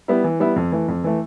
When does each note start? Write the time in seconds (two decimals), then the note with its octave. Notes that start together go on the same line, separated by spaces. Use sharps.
0.08 G3 B3 E4
0.24 E3
0.40 G3 B3 E4
0.56 F2
0.72 E3 A3
0.88 F2
1.04 E3 A3